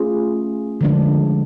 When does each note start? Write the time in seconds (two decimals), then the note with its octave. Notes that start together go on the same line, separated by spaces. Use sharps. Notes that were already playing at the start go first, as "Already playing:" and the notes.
Already playing: A3 C#4 F4 G#4
0.81 D3 F3 G#3 D4